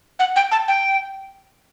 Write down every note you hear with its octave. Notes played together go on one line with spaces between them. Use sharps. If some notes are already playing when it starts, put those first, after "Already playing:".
F#5
G5
A5
G5